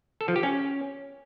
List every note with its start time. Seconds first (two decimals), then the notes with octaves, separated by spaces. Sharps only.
0.21 A4
0.28 F3
0.36 G4
0.43 C#4